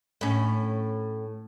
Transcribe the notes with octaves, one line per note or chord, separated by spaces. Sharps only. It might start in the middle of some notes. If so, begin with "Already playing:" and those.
A2 C#4